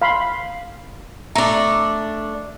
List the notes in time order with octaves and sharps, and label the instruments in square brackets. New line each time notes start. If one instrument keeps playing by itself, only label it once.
[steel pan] F5 B5 C6
[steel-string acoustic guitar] A3 D4 [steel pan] A#5